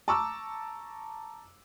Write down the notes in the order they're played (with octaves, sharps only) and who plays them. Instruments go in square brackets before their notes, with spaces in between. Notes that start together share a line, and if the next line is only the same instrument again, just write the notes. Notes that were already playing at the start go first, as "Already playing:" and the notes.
[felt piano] A5 A#5 C#6 D6 E6